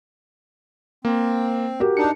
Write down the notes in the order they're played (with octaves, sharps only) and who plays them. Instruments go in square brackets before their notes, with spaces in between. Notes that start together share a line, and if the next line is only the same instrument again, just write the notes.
[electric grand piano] A#3 [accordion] C4
[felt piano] F#4 G4 A#4
[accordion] D4 D#4 [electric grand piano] C#7